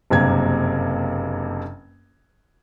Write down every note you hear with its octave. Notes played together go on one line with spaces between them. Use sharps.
F#1 G2 C3 A#3 G#6